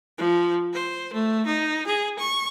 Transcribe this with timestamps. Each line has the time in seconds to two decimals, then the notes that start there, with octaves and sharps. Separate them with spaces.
0.18 F3
0.74 C5
1.13 A3
1.46 D#4
1.87 G#4
2.19 C#6